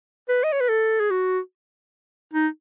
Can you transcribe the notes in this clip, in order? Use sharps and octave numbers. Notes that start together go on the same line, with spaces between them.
B4
D#5
C#5
B4
A4
G#4
F#4
D#4